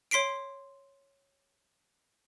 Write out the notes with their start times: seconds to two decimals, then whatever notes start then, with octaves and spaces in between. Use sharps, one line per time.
0.11 C#5 C6 B6 C7 D7